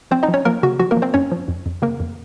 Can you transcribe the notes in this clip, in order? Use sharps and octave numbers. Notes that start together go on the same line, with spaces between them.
F3 C4 C5
D#4 D#5
F3
C#4 C#5
F3 A#3 A#4
C#3 F#4
F3 F#4
A#3 A#4
F3
C4 C5
F#2 C#4 C#5
F3
F2
F2
C#3 A#3 A#4
F2